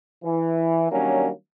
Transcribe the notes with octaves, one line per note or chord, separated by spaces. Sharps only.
E3
D#3 F#3 G3 A#3 C#4 D4